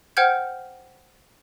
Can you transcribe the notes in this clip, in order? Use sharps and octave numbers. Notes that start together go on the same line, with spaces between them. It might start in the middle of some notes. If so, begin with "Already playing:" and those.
C5 F#5 G5 F6 G6 G#6